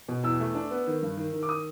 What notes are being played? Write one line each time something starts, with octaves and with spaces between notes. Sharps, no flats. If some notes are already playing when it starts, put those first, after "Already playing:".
B2
E2 E6
A3
D4
B3
D#3
G2
D#3
D#3
D6
D#6